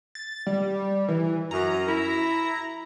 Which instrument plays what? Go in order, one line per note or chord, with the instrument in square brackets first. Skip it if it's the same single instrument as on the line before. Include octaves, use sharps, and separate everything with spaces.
[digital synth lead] A6
G3
E3
[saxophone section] F#2 [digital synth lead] A#5
[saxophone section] E4